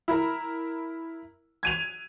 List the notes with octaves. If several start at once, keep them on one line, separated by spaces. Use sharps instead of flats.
E4 A#4
G#6 D#7 F7